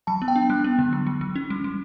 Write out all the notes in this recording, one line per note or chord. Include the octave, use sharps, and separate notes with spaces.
F#3 A5
B3
G5
D4
G3 F#6
B3
D3
F#3
F#3
F#3
C#4
G3
G3